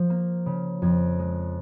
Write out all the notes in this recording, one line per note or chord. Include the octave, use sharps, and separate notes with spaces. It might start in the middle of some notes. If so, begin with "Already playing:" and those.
Already playing: F3
A#3
C#3
F2 G#6
G#3